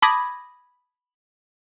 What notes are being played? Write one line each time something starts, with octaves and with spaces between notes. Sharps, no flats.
A5 B5 D6 D#6 G#6 A#6